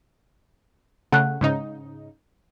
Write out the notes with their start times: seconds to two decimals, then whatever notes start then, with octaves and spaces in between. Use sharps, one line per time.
1.12 C#3 A3 F#5 F#6
1.41 G#2 C#3 D#4